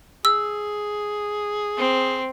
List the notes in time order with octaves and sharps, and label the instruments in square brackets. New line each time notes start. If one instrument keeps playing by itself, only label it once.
[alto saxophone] G#4 [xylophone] E6
[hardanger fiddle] C4